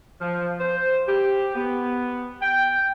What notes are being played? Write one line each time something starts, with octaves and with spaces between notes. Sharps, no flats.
F3
C5
G4
B3
G5